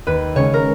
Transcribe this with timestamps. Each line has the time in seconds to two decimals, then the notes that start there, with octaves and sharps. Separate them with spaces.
0.07 D#2 B4
0.35 C#3 G#3 C#4 C#5
0.54 A#4